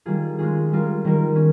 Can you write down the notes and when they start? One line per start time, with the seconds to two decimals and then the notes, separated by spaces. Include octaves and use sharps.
0.06 D#3 G3 A#3 F4 G#4
0.39 G#3 C#4 F4 G#4
0.72 G3 C#4 F4 A#4
1.04 D#3 G3 A#3 F4 A#4
1.36 C#4